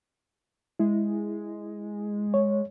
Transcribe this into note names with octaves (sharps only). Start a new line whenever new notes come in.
G#3 E4
C#5